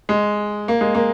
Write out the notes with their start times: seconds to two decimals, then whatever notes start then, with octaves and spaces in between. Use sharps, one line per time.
0.09 G#3
0.68 A#3
0.81 G#3
0.95 A#3